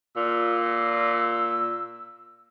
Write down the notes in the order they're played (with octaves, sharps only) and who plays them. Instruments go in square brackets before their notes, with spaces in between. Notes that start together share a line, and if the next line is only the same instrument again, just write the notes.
[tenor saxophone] A#2 [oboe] E6